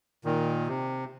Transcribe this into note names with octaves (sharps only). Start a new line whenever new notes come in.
A#2 D#3
C3